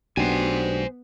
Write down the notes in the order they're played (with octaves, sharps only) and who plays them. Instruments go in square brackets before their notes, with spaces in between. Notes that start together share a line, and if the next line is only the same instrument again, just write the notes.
[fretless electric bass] B1 [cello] B3 [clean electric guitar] D4 F#4 G4 [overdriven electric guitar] C5 G#5